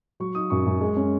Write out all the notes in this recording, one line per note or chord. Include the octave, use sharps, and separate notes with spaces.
F#3 C#6
D#4 D#6
F#2 C#6
F#2
G#3
C#4